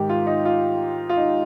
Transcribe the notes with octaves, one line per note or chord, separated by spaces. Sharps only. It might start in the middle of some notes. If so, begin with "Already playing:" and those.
Already playing: G#2 D#3 G4
F4
D#4
F4
F4
D#4